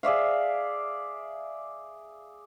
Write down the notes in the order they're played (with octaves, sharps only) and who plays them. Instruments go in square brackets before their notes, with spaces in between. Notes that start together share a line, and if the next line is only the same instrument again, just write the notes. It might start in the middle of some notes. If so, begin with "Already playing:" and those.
[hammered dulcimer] G#4 D5 E5 F5